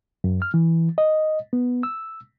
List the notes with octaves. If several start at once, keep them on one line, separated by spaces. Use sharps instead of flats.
F#2
F6
E3
D#5
B3
E6